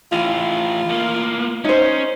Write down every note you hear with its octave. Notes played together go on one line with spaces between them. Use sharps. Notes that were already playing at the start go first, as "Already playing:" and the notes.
A2 E3 F4
A2 A#3
C#4 D#4 C5